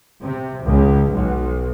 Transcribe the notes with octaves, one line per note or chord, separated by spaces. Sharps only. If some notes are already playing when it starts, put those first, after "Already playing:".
C3
C#2
B1